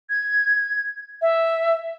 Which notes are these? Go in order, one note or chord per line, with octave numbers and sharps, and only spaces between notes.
G#6
E5